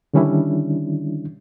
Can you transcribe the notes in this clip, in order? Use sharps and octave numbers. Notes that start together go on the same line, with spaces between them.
D3 D#3 G3 C#4 D4 E4